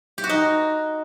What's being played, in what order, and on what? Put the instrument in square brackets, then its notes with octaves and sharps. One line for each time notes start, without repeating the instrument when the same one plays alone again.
[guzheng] G4
F#4
D#4